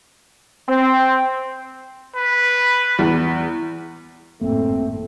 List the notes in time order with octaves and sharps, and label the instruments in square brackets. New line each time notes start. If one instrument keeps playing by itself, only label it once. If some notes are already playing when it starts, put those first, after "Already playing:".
[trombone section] C4
[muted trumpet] B4
[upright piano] E2
[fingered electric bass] G#1 F#2 A#3 [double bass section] A2 [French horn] A3 [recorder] C4